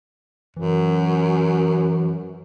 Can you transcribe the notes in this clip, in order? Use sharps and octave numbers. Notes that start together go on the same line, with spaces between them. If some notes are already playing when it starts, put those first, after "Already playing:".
F#2 E3